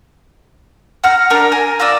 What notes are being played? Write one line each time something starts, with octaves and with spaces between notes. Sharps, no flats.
F#5 A#5 F6
D4 A#4 A#5
A#4 G#5
F4 A#4 D5 E6